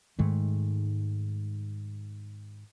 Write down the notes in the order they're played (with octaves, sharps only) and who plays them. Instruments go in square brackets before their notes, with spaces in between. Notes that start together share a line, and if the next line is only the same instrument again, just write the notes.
[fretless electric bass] G#2 D#3 G#3 A3